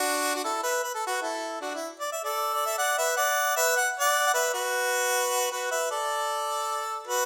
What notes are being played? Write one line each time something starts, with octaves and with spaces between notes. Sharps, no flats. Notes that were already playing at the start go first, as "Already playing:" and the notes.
Already playing: D4 F#4
F#4
E4 A4
B4 E5
B4
A4
F#4 B4
E4 A4
D4 F#4
E4
D5
E5
A4 D5
D5
E5
D5 F#5
B4 E5
D5 F#5
B4 E5
F#5
D5 F#5
F#5
B4 E5
F#4 B4
F#4 B4
B4 E5
A4 D5
F#4 B4